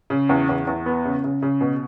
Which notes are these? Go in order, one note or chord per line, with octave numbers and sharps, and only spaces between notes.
C#3
E2
E2
E2
B3
C#3
C#3
C#3
B2